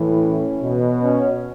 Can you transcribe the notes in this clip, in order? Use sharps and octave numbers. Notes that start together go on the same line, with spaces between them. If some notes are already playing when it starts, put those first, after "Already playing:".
Already playing: A2 E3
C#4
B2
C#4